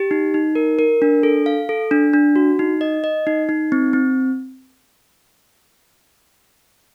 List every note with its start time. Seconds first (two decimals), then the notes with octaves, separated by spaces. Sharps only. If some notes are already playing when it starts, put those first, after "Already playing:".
Already playing: G4
0.11 D#4
0.34 D#4
0.55 A#4
0.79 A#4
1.02 D4
1.23 A4
1.46 F5
1.69 A4
1.91 D4
2.13 D4
2.36 F#4
2.59 D#4
2.81 D#5
3.04 D#5
3.27 D#4
3.49 D#4
3.72 C4
3.93 C4